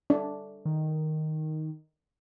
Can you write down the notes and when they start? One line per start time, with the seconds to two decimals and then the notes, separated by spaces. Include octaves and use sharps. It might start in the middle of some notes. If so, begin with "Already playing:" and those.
0.10 D4
0.65 D#3